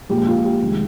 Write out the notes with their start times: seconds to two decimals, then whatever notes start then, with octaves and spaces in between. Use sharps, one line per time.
0.09 A#1 A#2 G#3 G4
0.27 F4
0.44 G4
0.61 F1 D#3 G#3